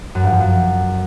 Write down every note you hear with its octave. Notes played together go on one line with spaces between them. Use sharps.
F#2
G2
F3
F#2